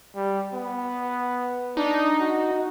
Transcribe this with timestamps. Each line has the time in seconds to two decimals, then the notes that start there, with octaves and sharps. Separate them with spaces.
0.16 G3
0.53 B3
1.77 D4 D#4
2.20 F#4